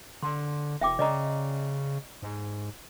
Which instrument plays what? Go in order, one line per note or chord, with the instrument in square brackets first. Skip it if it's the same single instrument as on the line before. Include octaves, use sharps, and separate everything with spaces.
[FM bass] D3 [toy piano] C6
[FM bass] E1 [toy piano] E5 G5 D6
[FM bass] C#3 [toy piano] D5 D#5 A#5
[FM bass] G#2